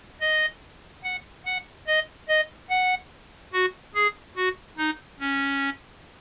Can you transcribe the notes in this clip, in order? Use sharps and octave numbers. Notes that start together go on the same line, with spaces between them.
D#5
F#5
F#5
D#5
D#5
F#5
F#4
G#4
F#4
D#4
C#4